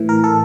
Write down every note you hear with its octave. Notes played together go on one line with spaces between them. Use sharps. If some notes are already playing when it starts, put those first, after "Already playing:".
Already playing: A2 E3
A#4
A4